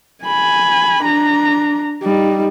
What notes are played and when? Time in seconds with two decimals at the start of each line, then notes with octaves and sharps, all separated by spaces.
0.24 G#5 B5
1.04 D4 A#5
2.03 G3 D#4